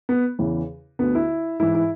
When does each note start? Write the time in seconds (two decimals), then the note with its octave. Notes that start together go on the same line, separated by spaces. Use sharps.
0.09 B3
0.39 E2 C#3 E3
0.99 D2 D3 B3
1.15 E4
1.59 G#2 E3 E4
1.75 E4